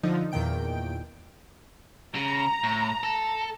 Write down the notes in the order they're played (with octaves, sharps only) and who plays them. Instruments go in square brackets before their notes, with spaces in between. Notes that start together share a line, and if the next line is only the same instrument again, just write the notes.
[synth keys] D3 F3 D#4
E2 A#2 D#3 G5 D7
[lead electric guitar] C#3 [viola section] A#5
[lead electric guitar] A2
A4